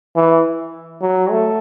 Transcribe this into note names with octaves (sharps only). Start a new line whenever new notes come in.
E3
F#3
A3